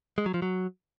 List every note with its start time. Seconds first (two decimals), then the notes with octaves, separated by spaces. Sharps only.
0.18 G#3
0.26 F#3
0.34 F3
0.42 F#3